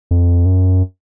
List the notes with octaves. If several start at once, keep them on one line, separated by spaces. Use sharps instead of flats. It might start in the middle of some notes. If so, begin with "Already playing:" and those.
F2
F#2